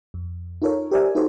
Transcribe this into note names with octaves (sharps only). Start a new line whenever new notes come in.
F2
D#4 F4 A4 A#4 C#5
G4 A#4 C5 D5 E5 G#5
D#4 F#4 G4 A4 C5 C#5